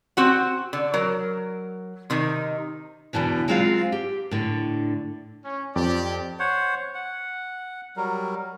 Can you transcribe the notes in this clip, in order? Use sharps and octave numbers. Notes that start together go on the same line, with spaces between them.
C4 F#4 F#5
D3
F#3 A#4
C3 D#3 D#4
E2 G2 B2 D3 E3
F#3 G#3 C4 F4 F5
G4
A2 D3
C#4
F2 G4 D5
C5 C#5 F#5
F#5
F#3 G3 A#4